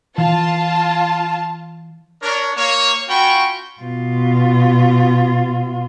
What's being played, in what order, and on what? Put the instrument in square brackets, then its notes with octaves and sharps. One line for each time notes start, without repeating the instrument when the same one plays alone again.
[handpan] E3 [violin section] F4 A5
[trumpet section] D4 A#4 C#5
A#3 C#5
C#4 F4 F#4 G5 B5 C#6
[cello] B2 F4